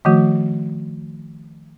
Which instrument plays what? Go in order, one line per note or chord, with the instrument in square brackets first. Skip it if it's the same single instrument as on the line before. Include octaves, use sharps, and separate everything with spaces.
[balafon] D#3 F3 A3 F#4